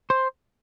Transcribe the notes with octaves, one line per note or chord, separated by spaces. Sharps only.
C5